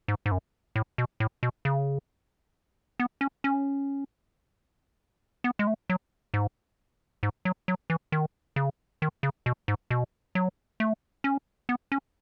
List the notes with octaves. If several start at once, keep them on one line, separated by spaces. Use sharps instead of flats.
G#2
G#2
F#2
A2
B2
A2
B2
C#3
B3
C#4
C#4
B3
G#3
A3
F#3
G#2
G#2
F#3
F#3
E3
D#3
C#3
D#3
C#3
B2
G#2
B2
F#3
A3
C#4
B3
C#4